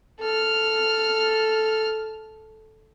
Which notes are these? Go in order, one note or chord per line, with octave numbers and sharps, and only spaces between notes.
A4 F6